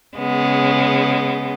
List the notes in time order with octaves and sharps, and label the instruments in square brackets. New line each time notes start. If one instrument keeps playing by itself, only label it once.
[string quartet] C#3 G#3 B3